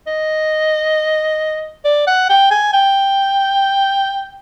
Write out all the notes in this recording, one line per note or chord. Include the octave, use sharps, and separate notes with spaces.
D#5
D5
F#5
G5
G#5
G5